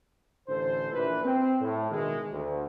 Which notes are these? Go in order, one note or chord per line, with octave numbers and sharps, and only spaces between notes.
A1 D3 A4 C5
A#1 E3 B4
C4
A2
B2 D#3 E3 G#3
D2